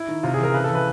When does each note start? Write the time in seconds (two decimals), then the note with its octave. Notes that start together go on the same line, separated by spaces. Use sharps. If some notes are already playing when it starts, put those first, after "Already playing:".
Already playing: E4
0.08 D#3
0.23 C3 F4
0.34 G#4
0.38 E3
0.43 A#4
0.54 C#3 B4
0.64 A4
0.69 E3
0.75 B4